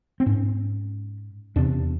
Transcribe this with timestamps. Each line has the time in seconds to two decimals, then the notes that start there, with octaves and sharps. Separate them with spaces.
0.20 C4
0.26 G#2 C#4
1.56 E2 C3 D4